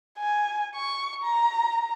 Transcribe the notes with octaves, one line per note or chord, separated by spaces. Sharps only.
G#5
C#6
A#5